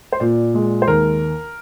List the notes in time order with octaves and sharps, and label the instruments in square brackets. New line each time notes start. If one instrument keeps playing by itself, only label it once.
[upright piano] C5
[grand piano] A#2 [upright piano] D5
[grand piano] G#3
[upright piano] C5
[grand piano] D#2 [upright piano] A#4